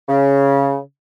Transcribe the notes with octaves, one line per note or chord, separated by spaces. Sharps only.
C#3